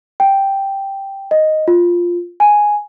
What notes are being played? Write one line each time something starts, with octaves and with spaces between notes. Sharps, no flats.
G5
D#5
F4
G#5